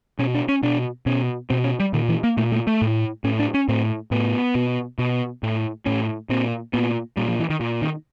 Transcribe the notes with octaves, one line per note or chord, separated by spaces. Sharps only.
B2 C#4
D4
C#4
B2 D4
B2 C#4
B2 C4
C#4
G3
A#2 D#3
E3
A#3
A#2 A3
A3
A3
A2
A2 C#4
D4
C#4
A2 C4
A2 B3
B2
B2
A2
A2 C#4
A#2 C4
A#2 B3
A#2 G3
F3
E3
D#3
A#2
D#3